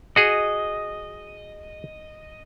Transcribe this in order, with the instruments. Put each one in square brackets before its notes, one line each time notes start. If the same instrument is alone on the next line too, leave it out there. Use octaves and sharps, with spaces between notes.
[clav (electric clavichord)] F#4 G#4 [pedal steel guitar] D#5